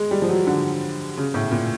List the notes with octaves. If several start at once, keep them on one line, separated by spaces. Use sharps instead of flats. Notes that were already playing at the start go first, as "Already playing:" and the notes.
Already playing: G#3
G3
F3
F#3
D3
C#3
A2
A#2